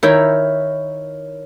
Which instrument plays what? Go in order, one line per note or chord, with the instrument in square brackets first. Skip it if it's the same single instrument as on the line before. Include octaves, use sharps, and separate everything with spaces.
[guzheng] D#3 E4 G5 [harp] A#4 C#5 E5